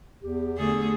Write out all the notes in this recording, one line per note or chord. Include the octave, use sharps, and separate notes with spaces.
E2 G4
D3 A3 G#4